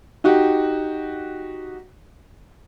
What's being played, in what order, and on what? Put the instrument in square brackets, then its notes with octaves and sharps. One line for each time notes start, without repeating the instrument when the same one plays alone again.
[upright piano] D#4 F#4 G4